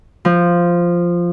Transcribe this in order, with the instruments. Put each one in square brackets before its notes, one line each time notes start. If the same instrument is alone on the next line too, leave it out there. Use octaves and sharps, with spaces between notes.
[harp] F3